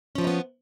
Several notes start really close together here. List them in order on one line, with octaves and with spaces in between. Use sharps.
C#4 F3 F4 D#4 B3